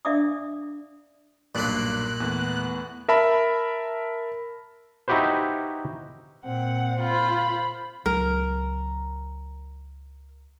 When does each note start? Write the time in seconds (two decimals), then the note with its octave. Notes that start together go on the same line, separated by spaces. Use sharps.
0.05 D4 D5 E5 F5 D6 D#6
1.55 B1 G2 A#2 A#3 F#6
2.20 E2 E3 A3 B3
3.08 A#4 E5 A5 B5
5.08 D#4 E4 F#4 G4 B4 C5
6.45 A#2 C4 F#5
7.01 F4 C5 B5
8.06 C#2 F#3 A#4